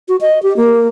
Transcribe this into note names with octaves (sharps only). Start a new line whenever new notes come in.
F#4
D#5
G4
A#3